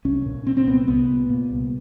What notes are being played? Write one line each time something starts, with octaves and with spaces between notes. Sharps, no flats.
C2 C#4
A#2
A#2 C4
C4
C2 B3
C2 B3
A#2
A#2
C2